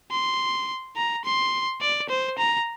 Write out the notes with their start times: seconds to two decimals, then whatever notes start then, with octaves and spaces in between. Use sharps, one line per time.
0.11 C6
0.96 A#5
1.25 C6
1.81 D5
2.09 C5
2.38 A#5